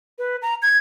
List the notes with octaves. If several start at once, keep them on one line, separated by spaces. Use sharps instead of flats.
B4
A#5
G#6